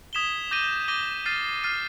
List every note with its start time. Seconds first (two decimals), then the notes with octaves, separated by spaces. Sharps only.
0.13 D#6 G#6 B6 E7 G7
0.51 D6 G6 A#6 D#7 G7
0.88 D6 G6 A#6 D#7 G7
1.26 F6 A6 C7 D#7
1.64 F6 A6 C7 D#7